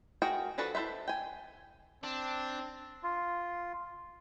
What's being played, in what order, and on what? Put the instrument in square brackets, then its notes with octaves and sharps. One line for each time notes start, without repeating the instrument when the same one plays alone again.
[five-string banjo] F#4 G#4 A#4 G5
F3 D4 F#4 A4 B4
E4 A4 B4 C5 E5
G5 G#5
[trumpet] C4 [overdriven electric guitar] D4
[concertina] F4